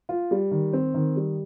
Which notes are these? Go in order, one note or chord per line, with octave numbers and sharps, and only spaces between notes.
F4
G3
D#3
C4
D#3
G3